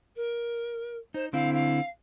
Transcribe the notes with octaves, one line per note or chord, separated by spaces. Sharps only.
A#4
D#4 C5
D3 C4 E4 F5
F5